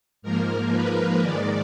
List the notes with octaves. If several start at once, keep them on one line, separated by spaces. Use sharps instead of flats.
G#2 F3 A#3 A#4
B4
G#2 D#3 G#3 D5